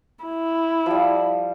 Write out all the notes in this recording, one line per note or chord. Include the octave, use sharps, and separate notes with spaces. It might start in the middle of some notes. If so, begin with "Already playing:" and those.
E4
F3 G3